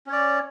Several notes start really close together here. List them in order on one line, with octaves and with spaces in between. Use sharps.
C#4 C#5 D5